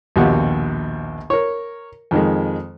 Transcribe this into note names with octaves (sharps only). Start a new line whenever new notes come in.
A#1 D#2 B2 F4 G4 F#5
A#4 C#5
F2 D#3 G#3